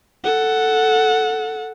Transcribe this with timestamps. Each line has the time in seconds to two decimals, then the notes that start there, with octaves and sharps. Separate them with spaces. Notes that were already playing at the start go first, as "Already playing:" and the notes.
0.24 A4 F#5